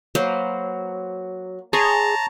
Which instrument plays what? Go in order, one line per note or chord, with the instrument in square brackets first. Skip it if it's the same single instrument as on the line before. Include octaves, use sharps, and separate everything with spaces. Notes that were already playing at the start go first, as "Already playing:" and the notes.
[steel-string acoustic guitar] F#3 [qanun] A#3 B4 C5
[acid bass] G#4 [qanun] C#5 C6 [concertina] A5 A#5